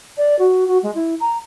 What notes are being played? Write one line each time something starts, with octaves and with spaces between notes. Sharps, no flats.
D5
F#4
F#4
G#3
E4
A#5